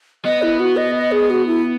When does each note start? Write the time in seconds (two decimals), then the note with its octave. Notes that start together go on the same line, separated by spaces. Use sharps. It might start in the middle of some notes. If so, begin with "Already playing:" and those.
0.25 B3 D#5
0.42 E4
0.60 F#4
0.77 D#5
0.95 D#5
1.12 G#4
1.30 F#4
1.47 E4